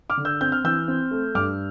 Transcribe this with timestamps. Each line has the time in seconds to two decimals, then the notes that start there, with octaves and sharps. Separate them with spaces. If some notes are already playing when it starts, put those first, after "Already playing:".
0.10 D6 F6
0.17 D3
0.25 E6 G6
0.41 C4 G6
0.52 F6
0.64 E3 E6 G6
0.88 C4
1.11 A3
1.35 G2 D6 F6